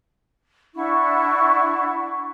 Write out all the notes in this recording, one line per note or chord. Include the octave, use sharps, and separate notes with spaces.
D4 E4 F#5 C#6